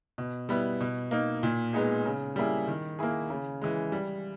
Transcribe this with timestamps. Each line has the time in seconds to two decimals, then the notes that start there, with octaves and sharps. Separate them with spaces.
0.18 B2
0.49 G3 B3 E4
0.80 B2
1.11 A#3 D#4
1.43 A#2
1.73 G#3 B3 D#4 G#4
2.06 C#3
2.36 G3 A#3 E4 G#4
2.68 D#3
2.99 A#3 E4 G#4
3.30 C#3
3.62 E3 G#3
3.92 G3